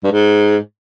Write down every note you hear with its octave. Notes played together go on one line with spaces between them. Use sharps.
G2
G#2